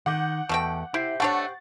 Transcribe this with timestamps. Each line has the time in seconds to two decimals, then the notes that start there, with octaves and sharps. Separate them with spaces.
0.06 D#3 F#5 D6 G6
0.49 E2 B2 A3 G5
0.94 E4 G4 C5
1.20 A3 D4 C#5 F#5 C#6 A6